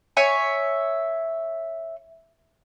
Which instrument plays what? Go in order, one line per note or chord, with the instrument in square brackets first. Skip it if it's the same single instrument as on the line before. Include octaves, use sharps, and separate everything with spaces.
[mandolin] C#5 E5 G#5